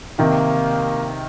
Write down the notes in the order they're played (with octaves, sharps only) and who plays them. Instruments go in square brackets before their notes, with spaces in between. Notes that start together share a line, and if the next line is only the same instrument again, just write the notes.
[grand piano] C3 D#3 [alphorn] A#3